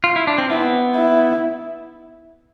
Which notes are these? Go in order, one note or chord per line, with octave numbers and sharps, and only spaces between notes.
F4
E4
D4
C4
B3 E4
E4